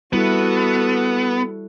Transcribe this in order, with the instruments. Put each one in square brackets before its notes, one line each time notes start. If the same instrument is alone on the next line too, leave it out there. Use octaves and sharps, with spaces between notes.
[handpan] G3 E4 [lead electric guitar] B3 [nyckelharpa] F#4 A4